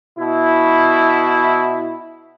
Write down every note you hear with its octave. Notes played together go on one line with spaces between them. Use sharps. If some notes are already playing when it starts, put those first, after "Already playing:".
B2 E4